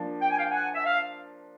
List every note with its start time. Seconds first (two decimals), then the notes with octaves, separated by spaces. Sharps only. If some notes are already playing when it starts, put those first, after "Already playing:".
Already playing: F3 A#3 D4
0.21 G5
0.30 G#5
0.38 F5 G5
0.51 F#5 G#5
0.74 E5
0.86 F5